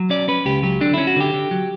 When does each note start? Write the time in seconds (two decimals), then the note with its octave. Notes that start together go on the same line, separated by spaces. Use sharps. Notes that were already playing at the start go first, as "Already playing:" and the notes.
Already playing: F#3
0.10 C#4 D5
0.28 C#4 B4
0.45 C#2 G4
0.63 F#3 G4
0.81 D3 D4
0.94 C#4 E4
1.07 F#4
1.16 D3 G4
1.34 D3
1.51 F#3